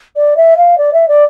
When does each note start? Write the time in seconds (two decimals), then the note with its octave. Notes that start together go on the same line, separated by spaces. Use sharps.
0.16 D5
0.36 E5
0.57 F5
0.78 D5
0.93 E5
1.08 D5